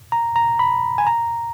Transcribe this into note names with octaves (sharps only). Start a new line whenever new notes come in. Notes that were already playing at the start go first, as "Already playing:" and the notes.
A#5
A#5
B5
G#5
A#5